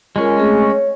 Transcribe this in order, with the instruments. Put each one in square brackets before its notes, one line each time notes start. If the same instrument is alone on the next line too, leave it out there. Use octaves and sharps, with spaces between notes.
[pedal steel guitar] G#3 C#4 [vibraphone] F4 A#4
[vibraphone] A3 C4 G#4
C#5